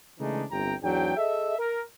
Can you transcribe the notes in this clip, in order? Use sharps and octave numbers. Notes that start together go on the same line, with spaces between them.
C#3 E3 G#3 A3 D4 D#4
G1 C2 C3 C4 G5 A#5
E2 G#2 F#3 D4 G5
G#4 A4 D#5 E5
A#4